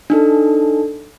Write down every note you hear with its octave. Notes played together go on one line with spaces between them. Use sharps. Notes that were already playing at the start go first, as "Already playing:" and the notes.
D4 D#4 A4